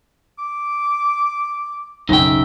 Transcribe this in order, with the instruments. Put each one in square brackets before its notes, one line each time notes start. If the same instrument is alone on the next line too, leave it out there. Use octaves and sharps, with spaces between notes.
[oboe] D6
[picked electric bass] B1 F#2 C#3 [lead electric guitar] D#4 G5 [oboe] E5